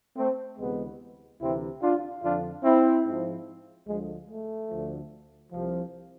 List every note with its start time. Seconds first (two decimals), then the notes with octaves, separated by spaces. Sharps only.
0.16 A3 C4
0.58 D2 C3 E3 G#3 B3
1.40 D2 C3 E3 C4 E4
1.81 D4 F4
2.22 F2 D3 F3 D4 F4
2.63 C4 E4
3.05 G#2 F3
3.86 D2 D3 F3 G#3
4.28 A3
4.69 D2 D3 F3
5.52 C2 C3 F3